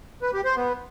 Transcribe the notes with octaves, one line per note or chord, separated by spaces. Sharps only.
B4
G4
C5
B3